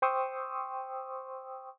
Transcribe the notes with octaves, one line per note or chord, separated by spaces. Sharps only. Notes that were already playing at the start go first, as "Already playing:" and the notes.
C5 G5 C6 C#6 D#6 E6